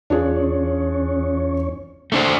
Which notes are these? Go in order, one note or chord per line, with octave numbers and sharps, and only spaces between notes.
E2 C#4 D4 F4 G#4 C#5
A3 D4 C5